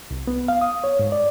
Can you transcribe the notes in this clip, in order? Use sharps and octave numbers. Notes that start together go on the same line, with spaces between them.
C2
B3
F5
D#6
C#5
G#2
D5